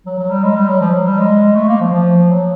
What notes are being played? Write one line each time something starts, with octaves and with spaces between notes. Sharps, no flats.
F#3
F#3
G3
G#3
G3
F#3
F3
F#3
G3
G#3
A3
A#3
F3
F3
F#3